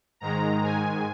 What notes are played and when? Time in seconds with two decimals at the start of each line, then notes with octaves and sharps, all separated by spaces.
0.20 G#2 D#3 G#3 A#5
0.63 G#5